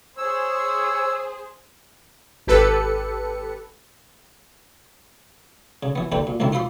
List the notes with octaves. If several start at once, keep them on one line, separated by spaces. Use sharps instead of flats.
G#4 C5 C#5 E6
G#1 G4 A4 B4 C#7
C#3
E3 B3
D#2 D3 D4 B4 G5
A#2
C#2 A2 D#3 C4 E4
F4 C5 E5 B5 C6 D6